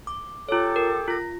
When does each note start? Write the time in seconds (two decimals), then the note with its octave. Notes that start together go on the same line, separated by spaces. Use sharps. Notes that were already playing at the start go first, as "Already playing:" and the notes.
0.07 D6
0.49 F4 G4 A4 C#5 D6
0.76 A#4
1.08 F4 A#6